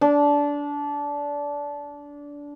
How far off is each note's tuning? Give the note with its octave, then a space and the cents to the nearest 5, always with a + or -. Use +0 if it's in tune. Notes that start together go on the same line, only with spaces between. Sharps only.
D4 -20